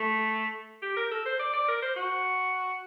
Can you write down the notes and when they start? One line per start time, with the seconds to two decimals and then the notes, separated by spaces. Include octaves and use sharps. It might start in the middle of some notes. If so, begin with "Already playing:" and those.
Already playing: A3
0.82 G4
0.96 A#4
1.11 A4
1.25 C5
1.39 D5
1.54 D5
1.68 A#4
1.82 C5
1.96 F#4